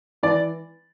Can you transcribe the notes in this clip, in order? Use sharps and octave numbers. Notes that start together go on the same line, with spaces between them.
E3 D5